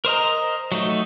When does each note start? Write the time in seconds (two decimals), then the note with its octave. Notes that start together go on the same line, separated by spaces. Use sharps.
0.05 A#4 C5 D#5 A#5
0.72 F#3 A3 D#4